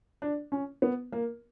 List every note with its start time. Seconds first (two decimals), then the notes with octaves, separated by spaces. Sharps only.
0.22 D4
0.52 C#4
0.82 B3
1.12 A#3